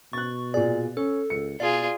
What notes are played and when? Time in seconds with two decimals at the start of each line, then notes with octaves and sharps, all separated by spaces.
0.13 B2 C#6 F#6 A6
0.54 A#2 G#4 D5
0.97 C#4 A4
1.30 C#2 C#7
1.60 B2 F4 G#4 D5